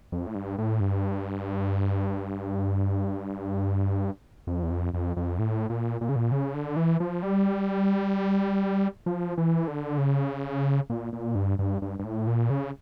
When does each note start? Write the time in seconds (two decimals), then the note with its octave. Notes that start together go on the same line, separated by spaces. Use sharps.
0.12 F2
0.27 A2
0.35 G2
0.58 A2
0.80 G2
4.47 F2
4.63 E2
4.70 F2
4.94 F2
5.17 F2
5.39 A2
5.70 A#2
6.01 A#2
6.09 C#3
6.16 A#2
6.32 C#3
6.54 D3
6.76 E3
7.00 F3
7.23 G3
9.06 F3
9.37 E3
9.68 D3
9.98 C#3
10.90 A#2
11.13 A#2
11.35 G2
11.59 G2
11.82 G2
11.99 G2
12.04 A2
12.27 A#2
12.50 C#3